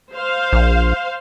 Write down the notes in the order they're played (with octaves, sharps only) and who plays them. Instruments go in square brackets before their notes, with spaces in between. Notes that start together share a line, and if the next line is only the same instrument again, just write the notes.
[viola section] C5 F5
[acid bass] A#1